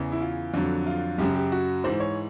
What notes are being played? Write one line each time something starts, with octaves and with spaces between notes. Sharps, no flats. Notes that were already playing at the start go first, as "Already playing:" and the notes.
Already playing: E2 C#3 E3
E4
F4
F2 D3 F#3
F4
F#2 C#3 F#3 G4
G4
F#4
G#2 E3 C5
C#5